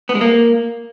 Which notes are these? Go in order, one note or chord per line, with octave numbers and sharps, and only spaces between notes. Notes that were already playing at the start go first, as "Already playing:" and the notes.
B3
G#3
A#3